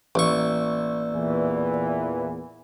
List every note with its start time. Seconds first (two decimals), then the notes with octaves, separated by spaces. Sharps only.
0.15 A1 A#3 D5 C#6 E6
1.13 E2 A#2 E3